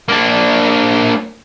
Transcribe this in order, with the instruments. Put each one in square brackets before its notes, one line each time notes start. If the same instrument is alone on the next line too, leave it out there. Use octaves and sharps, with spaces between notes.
[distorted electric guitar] A#3 D4